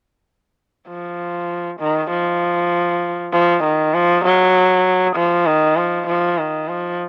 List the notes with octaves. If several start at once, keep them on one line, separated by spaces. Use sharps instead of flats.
F3
D#3
F3
F3
D#3
F3
F#3
F3
D#3
F3
F3
D#3
F3